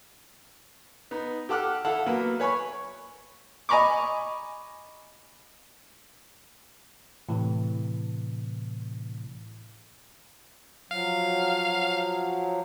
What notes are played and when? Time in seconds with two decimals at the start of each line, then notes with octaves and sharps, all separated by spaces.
1.11 B3 D#4
1.49 G4 A4 F#5 D6 F6 F#6
1.85 E4 A4 F5 F#5
2.06 F#3 A#3 B3
2.40 B4 C#5 G#5 B5 C#6
3.69 D#5 G#5 A#5 B5 C#6 D6
7.29 A2 C3 E3
10.91 F3 F#3 F5